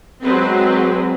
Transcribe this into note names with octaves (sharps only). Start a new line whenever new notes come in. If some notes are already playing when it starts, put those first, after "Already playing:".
F#3 G#3 C4 B4